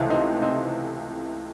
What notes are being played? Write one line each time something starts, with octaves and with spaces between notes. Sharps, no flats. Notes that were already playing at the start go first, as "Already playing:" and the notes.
Already playing: C#2 C3 E3 A3
C4 D#4
C4 D#4